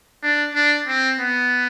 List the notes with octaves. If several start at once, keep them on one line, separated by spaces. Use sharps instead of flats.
D4
D4
C4
B3